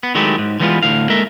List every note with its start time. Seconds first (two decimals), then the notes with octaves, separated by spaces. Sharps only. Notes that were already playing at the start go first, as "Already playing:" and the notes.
0.03 B3
0.15 D#3 F#3 G#3 A3 E4 G4
0.38 G#2
0.60 D3 E3 G3 G#3 B3 F4
0.83 D2 A2 F5
1.09 G#3 A#3 A4 A#4 E5